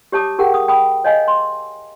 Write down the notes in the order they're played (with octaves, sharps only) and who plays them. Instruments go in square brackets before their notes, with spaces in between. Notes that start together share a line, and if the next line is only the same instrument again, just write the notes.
[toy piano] G4 C#5 A5 D6 D#6
G4 G#4 A#4 F#5 G5
D#6
G5 B5 D#6
C#5 D#5 F5 G#5
C6